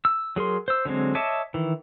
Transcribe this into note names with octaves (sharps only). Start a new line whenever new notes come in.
E6
F#3 G#4 A#4 C6
C5 E6
D3 F#3 G#3 C4
C#5 D#5 E5 A5 D6
D#3 E3